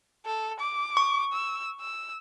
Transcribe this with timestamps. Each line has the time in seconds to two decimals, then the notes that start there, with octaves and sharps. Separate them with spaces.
0.25 A4
0.60 D6
0.97 C#6
1.32 E6
1.80 E6